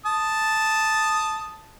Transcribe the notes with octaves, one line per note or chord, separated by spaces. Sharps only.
A5 D#6